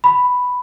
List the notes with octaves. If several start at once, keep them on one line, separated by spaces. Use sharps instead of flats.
B5